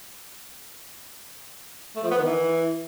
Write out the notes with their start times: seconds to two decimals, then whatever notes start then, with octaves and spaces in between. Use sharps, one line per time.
1.96 A3
2.04 F3
2.11 B3
2.18 D#3
2.26 E3